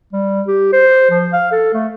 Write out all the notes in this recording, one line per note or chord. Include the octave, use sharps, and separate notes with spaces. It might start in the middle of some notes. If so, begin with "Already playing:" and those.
G3
G4
C5
F3
F5
A4
A3